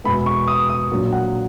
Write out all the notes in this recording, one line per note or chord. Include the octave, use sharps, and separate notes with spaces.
E2 B2 G#3 B3 B5
C#6
D#6
D#6
A#1 A#2 F#3 A#3
F#5